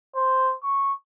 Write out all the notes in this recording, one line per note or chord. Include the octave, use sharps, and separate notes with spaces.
C5
C#6